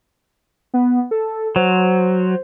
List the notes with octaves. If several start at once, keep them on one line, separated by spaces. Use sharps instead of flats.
B3
A4
F#3 C5